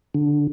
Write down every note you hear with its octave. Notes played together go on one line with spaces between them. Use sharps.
D3